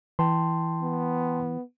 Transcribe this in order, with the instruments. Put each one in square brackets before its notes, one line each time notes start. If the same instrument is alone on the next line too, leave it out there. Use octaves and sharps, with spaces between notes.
[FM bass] E3 [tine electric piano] G5 A5 C6
[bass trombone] B3